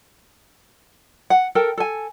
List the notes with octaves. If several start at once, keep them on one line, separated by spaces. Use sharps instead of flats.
F#5
A4 A#4 G5
A4 G#5